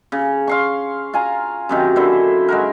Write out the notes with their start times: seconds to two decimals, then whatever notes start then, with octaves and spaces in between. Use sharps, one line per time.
0.12 C#3
0.47 F5 C6 C#6
1.13 F4 G#5 A#5
1.69 F#2 C3 D#3
1.96 D3 E4 C5
2.49 G#3 F#4 A#4